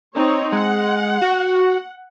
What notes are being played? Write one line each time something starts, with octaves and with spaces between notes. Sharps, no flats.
C4 D#4 C#5
G#3 F#5
F#4